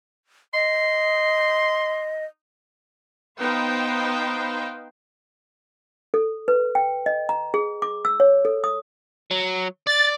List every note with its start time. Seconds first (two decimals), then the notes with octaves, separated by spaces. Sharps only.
0.54 D#5 C6
3.39 B3 D#4 B4 C5 F5 G5
6.14 A4
6.48 B4
6.75 G5
7.06 D#5
7.29 A#5
7.54 G#4
7.82 D6
8.05 E6
8.20 C#5
8.45 A4
8.64 D#6
9.31 F#3
9.87 D5 A6